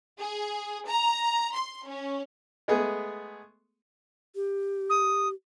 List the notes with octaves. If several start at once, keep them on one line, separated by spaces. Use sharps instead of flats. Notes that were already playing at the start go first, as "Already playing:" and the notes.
G#4
A#5
C6
C#4
G#3 A3 B3 G#4
G4
D#6